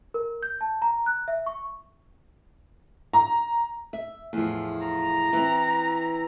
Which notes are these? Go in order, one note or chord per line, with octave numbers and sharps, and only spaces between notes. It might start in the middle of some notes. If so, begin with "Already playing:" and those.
A#4
G6
A5
A#5
F#6
E5
C#6
A#5
E5
E2 A2 F3
A#5
E3 C4